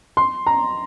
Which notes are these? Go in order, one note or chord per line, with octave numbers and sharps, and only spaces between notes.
C6
A#5